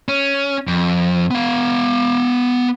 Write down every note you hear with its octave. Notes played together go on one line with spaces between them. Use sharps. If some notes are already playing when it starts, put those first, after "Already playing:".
C#4
F2
B3 F5